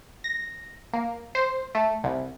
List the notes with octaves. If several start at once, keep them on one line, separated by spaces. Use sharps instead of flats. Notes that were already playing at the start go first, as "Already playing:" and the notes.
A#6
A#3
C5
A3
C2